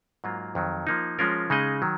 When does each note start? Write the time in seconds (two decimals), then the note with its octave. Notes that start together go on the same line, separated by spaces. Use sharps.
0.24 G#2 F#3 A#3 F4
0.55 F2 D#3 F#3
0.87 F3 A#3 D#4
1.19 F3 G#3 C#4 F4 A#4
1.50 C#3 G#3 D#4 G#4 D#5
1.82 D#3 F#3